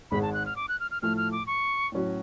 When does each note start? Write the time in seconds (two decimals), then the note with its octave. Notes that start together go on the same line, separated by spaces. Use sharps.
0.11 G#1 G#2 G#3 B5
0.22 A5
0.33 F#6
0.46 F6
0.56 D6
0.69 F#6
0.80 F6
0.91 F6
1.02 A2 F3 A3 F6
1.17 F6
1.32 D6
1.47 C#6
1.92 A2 F#3 C#4 F#4